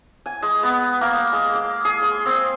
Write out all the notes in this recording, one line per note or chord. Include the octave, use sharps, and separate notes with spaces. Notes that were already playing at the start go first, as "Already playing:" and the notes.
G#5
G#3
B3
A#3
G#3
D6
G#4
C6
C4